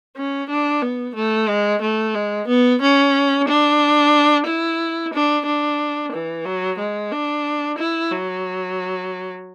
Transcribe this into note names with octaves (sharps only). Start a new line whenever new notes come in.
C#4
D4
B3
A3
G#3
A3
G#3
B3
C#4
D4
E4
D4
D4
E3
F#3
G#3
D4
E4
F#3